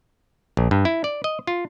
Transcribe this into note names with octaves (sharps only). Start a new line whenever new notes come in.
A#1
G2
E4
D5
D#5
F4